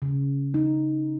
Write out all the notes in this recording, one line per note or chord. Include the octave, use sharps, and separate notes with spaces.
C#3
D#4